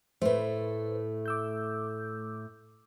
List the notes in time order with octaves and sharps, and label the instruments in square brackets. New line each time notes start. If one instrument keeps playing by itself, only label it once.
[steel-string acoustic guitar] A2 A3 [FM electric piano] B4 C5
[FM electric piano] D6 E6 G6